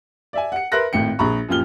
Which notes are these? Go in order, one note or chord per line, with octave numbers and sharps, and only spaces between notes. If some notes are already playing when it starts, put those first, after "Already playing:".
D5 E5 G#5
F#5 C#7
A#4 B4 E5 C6 F#6 A#6
G#1 A2 G5 C#7
A#1 G#4 A#5 B5 C#6
F#2 A#2 F3 G4 F6 G7